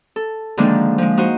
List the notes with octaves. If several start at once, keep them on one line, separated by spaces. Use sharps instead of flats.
A4
D3 D#3 F3 G#3 A#3 D4
F3 G#3
D#4 F#4 C5 D#5